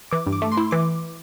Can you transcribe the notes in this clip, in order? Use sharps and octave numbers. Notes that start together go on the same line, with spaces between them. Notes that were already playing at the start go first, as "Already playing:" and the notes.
E3 D6
G2
D6
A3
C6
E4
E3 D6